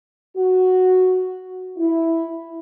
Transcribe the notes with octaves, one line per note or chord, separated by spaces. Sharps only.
F#4
E4